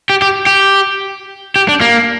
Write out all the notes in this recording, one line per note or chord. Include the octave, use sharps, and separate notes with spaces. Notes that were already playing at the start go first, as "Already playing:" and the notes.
G4
G4
G4
G4
D4
A#3